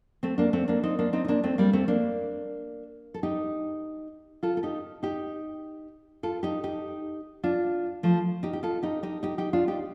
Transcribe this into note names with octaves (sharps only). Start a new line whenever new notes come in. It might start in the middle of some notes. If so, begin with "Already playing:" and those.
A3 C4
A#3 D4
A3 C4
A#3 D4
C4 D#4
A#3 D4
C4 D#4
D#4
A#3 D4
A3 C4
G3 A#3
A3 C4
A#3 D4
A4
D#4 G4
F4 A4
A4
D#4 G4
D#4 G4
F4 A4
D#4 G4
D#4 G4
D4 F4
F3 A3
D#4 G4
G4
F4 A4
D#4 G4
D#4 G4
D#4 G4
D#4 G4
D4 F4
D#4 G4